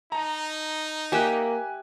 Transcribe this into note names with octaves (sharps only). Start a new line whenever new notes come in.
D#4 A5 A#5
A#3 G4 E5 G#5 F#6